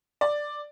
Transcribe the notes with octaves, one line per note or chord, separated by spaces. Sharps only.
D5